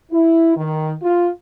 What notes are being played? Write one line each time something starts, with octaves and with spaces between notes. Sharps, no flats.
E4
D#3
F4